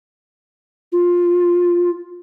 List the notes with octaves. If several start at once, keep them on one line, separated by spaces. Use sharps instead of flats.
F4